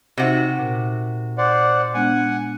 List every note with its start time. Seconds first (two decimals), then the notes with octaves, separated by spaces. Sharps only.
0.18 C3 D#4 F#4 C5
0.59 A#2
1.38 C5 D5 F#5
1.94 G#3 B3 D4 F#5 G#5